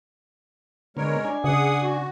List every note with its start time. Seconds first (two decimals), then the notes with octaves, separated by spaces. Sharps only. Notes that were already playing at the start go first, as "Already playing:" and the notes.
0.97 D3 G#3 B3 A#4 C#5
1.25 D4 G#5
1.44 C#3 G#4 F#5 D#6
1.82 F#4